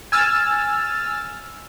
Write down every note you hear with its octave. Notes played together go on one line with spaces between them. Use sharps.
G#5 E6 F6 A6